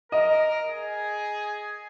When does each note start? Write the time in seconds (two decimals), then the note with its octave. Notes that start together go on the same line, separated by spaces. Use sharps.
0.12 A#4 D#5
0.69 G#4